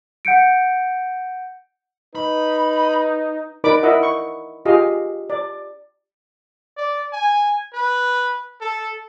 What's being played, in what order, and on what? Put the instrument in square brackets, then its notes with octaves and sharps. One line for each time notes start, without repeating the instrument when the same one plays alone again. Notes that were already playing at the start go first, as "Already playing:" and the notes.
[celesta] F#5 G6 C#7 D7
[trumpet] D#4 [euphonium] B4 [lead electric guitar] B5
[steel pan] D#4 A#4 B4 D5 B5 D6
E4 A#4 D#5 E5 F#5
C#6
F4 G4 G#4 D#5 F5
D5
[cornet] D5
G#5
B4
A4